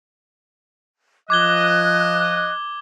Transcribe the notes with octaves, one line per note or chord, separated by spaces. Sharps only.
F3 D#5 D6 F#6 G#6 G7